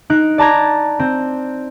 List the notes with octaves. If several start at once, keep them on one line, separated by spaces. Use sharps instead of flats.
D#4 F#6 D7
D5 A5 A#5 G#6
C4